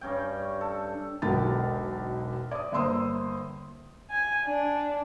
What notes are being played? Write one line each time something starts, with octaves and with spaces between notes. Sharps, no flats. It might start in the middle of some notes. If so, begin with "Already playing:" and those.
G2 C#4 G5
A4
E1 B1 D3 A#4 G5 A6
D5 D#6
G1 A#3 C5 C6 D#6 E6
G#5
D4